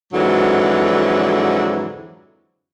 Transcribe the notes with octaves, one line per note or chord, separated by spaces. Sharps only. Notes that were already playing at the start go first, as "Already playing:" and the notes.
F2 G#2 D3 E3 F#3